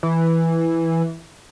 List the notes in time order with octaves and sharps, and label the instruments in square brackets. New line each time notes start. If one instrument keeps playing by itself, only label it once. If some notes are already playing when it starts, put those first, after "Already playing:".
[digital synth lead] E3